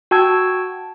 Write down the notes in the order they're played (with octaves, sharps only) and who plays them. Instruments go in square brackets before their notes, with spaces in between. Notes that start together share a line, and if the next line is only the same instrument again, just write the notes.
[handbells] F#4 G5 A5 E6 G#6